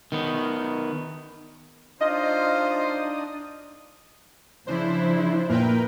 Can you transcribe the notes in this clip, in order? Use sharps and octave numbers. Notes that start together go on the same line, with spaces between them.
D#3 B3
D4 D#4 F4 C5 D#5 D#6
C#3 F3 D4 E4 C5
A#2 A#4 B4 G5